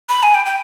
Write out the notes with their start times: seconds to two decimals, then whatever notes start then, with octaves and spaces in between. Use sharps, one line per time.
0.09 B5
0.23 G#5
0.34 G5
0.46 G5